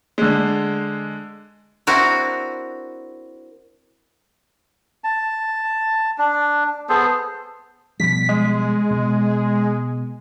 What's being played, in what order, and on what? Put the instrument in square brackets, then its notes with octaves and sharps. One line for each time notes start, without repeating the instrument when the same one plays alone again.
[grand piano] D3 G#3
[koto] C4 D4 E4 F#4 A#4
[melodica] A5
D4
B3 G#4 A4 C5
[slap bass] B2 F3 G3 [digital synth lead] B6
[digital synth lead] G#3
[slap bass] B2